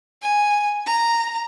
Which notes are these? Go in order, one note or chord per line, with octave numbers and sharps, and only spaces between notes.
G#5
A#5